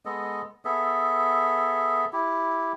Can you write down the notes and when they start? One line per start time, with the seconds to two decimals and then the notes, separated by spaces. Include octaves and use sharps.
0.05 G#3 B3 A4 D#5
0.65 B3 G#4 A4 E5
2.13 E4 G4